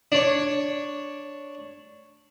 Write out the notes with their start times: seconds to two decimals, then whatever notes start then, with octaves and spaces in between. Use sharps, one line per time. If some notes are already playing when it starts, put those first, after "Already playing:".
0.12 D4 C#5